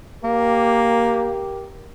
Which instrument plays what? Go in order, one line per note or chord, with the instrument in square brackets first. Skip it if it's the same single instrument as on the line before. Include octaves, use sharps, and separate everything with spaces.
[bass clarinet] A#3 [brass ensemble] G4 A#4